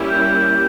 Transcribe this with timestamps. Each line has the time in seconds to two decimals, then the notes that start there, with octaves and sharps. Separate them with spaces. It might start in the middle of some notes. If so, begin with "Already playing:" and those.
Already playing: G3 A#3 C#4 E4 G4
0.09 G6